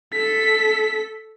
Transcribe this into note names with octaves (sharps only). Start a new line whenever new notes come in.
A4 B6